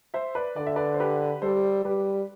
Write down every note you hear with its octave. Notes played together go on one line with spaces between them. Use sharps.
C5 E5
B4 D5
D3 D5
E5
B4 D5
C5
G4 B4
G3 A4 C5
G3 G4 B4